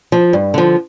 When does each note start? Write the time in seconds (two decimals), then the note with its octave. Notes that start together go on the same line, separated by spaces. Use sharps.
0.12 F3
0.33 G2
0.54 D3 F3